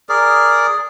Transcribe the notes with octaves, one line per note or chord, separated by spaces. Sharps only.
G#4 A#4 D5